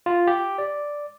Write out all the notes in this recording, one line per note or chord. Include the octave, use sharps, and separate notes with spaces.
F4
G4
D5